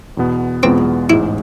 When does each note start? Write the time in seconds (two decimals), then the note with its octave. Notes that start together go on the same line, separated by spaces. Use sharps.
0.17 E2 B2 B3
0.63 E2 B2 G#3 B3 C4 F4
1.10 A1 G#2 G#3 E4